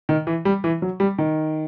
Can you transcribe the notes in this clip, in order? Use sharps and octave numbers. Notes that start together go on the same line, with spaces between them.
D#3
E3
G3
E3
F#3
G3
D#3